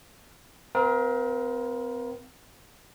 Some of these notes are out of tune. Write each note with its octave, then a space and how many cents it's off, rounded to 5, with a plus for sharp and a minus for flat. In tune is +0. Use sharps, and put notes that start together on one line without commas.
C4 -35 A#4 +30 F5 +5